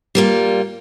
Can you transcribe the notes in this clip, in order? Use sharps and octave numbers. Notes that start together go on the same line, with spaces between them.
G3 A#3 F4